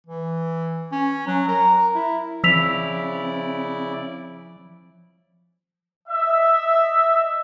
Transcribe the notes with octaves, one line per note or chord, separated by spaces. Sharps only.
E3
C#4
F#3
A#4
E4
C#3 F3 C4 E4 D5 E6 B6 F7
D#5 E5